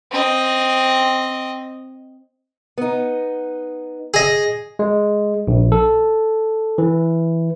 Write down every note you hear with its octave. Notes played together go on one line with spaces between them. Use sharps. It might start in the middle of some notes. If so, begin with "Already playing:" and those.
C4 D#5
B3 D#4
G#4 D#5
G#3
A#1
A4
E3